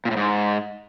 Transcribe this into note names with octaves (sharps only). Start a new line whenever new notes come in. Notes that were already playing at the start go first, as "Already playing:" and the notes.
A#2
A2
G#2